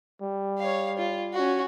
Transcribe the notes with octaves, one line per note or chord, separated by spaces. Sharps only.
G3
C#5 F5
F4
C#4 F#4